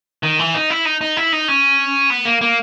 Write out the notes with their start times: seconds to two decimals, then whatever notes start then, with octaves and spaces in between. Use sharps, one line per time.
0.23 D#3
0.39 E3
0.54 D#4
0.70 E4
0.85 D#4
1.01 D#4
1.17 E4
1.33 D#4
1.48 C#4
2.10 B3
2.25 A#3
2.41 A#3